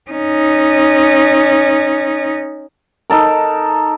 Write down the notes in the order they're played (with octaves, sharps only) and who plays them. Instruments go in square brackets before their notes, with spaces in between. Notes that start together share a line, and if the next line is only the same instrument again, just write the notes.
[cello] C#4 D#4
[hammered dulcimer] D#4 A4 A#4